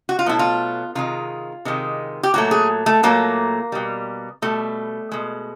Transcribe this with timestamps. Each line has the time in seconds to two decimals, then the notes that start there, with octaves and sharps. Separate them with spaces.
0.09 F#4
0.19 F4
0.26 B2 F#3 A3 E4
0.39 F4
0.95 C3 D#3 G#3 F4
1.65 C3 D#3 G#3
2.23 G4
2.34 A#2 F#3 A3 F#4
2.51 G#4
2.86 A3
3.03 A#2 F#3 A3 A#3
3.72 B2 G3
4.42 B2 G3 A3
5.12 B2 G#3